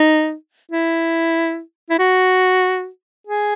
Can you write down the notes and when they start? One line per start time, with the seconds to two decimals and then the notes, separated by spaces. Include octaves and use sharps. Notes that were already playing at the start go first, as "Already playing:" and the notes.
Already playing: D#4
0.72 E4
1.90 E4
1.99 F#4
3.27 G#4